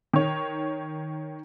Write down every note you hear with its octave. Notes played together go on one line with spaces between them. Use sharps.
D#3 C#5